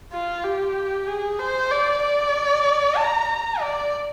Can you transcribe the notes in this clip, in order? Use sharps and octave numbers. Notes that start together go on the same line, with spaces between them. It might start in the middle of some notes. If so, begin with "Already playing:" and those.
F4
G4
G#4
C5
D5
D5
A#5
A#5
D5